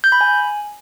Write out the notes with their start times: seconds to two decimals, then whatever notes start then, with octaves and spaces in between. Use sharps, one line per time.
0.04 G6
0.12 B5
0.21 G#5